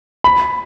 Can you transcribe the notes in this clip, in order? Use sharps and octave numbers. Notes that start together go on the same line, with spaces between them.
B5